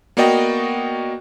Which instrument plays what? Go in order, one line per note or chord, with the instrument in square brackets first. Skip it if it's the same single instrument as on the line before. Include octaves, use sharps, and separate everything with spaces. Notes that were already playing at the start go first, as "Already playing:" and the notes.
[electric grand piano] A#3 B3 F#4 D5 D#5 G5